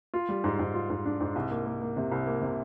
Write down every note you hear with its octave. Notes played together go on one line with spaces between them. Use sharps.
F4
G3
G#2
G#2
F4
G#2
D4
G#2
C2
A#3
A#3
A#3
C3
C2
A#3
C3